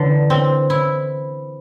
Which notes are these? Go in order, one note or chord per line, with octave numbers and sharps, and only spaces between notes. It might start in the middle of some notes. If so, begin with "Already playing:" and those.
Already playing: D3 E3
C4
E4